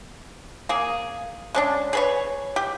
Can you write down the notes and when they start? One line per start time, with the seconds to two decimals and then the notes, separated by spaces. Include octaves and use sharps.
0.69 A#3 G#4
1.55 G#3 C#4 D4
1.93 G#4 B4 C#5
2.56 G4